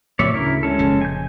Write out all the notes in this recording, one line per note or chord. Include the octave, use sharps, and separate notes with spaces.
A2 C3 F3 C#5 D5 E5
D2 C#3 E4 A#4
G#3 C#4 A4
F1 A#2 C#3
G#5 G6